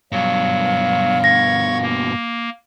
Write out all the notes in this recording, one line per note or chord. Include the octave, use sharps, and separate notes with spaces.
G2 B2 F#3 F5
C#6 G#6 A#6
A#3